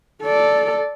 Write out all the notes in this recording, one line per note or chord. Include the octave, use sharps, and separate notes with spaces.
A4 D5